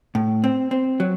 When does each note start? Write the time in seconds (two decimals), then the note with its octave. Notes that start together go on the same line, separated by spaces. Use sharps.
0.15 A2
0.44 C4
0.71 C4
1.00 F#3